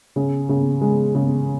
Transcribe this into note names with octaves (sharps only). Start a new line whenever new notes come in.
C#3
C#3
G#3
C#3